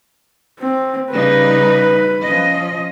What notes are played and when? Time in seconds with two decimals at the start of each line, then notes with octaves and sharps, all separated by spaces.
0.60 C4
1.12 C#3 G3 D#4 B4
2.23 F3 C#4 D#5